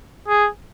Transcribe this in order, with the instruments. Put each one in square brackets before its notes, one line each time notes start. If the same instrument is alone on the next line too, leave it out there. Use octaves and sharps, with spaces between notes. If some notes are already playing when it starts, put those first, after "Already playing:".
[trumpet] G#4